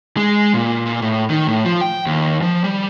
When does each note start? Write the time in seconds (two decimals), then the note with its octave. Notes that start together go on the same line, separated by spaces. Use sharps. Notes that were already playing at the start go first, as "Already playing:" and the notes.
0.17 G#3
0.54 A#2
0.86 A#2
1.02 A2
1.30 D#3
1.47 A2
1.65 F3
1.81 G5
2.06 D#2
2.42 F3
2.64 G3